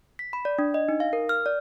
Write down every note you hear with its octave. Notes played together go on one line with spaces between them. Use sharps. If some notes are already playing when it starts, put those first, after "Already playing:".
B6
B5
D5
D4
D#5
D#4
F5
A#4
F6
D5